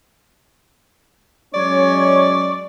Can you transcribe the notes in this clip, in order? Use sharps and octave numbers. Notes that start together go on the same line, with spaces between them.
F#3 G#3 C#4 C#5 D5 C#6